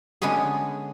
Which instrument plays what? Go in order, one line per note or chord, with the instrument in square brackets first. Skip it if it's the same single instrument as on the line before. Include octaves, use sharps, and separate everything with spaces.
[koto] D3 G#3 B3 C#4 G#4